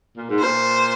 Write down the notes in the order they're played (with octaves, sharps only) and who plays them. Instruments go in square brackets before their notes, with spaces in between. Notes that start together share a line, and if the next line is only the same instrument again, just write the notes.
[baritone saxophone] A#2
G#2
[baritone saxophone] A#2 [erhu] C5